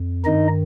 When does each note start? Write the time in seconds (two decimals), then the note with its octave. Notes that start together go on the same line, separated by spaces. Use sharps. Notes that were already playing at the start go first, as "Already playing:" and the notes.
Already playing: F2
0.24 G2 D#3 D#4 D#5